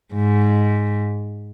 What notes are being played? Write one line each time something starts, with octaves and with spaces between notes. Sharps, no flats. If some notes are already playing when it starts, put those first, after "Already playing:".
G#2